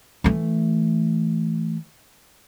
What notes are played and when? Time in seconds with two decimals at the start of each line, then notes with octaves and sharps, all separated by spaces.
0.24 E3 A3